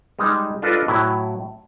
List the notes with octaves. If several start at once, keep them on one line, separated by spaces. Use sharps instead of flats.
G3 G#3 D#4
D4 F4 A4 B4 D5 D#5
A2 F#3 E4